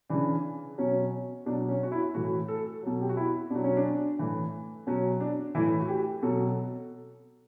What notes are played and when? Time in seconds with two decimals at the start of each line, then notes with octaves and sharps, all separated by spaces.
0.10 C#3 E3 D4
0.78 B2 F#3 C#4
1.46 B2 F#3 D4
1.69 C#4
1.83 F#4
1.92 E4
2.14 A2 E3 F#4
2.48 A4
2.83 B2 F#3
3.01 G4
3.09 F#4
3.17 E4
3.50 B2 F#3 D4
3.64 C#4
3.77 D4
4.19 A2 E3
4.87 B2 F#3 C#4
5.21 D4
5.55 A2 E3 E4
5.80 F#4
5.89 G4
6.23 B2 F#3 A4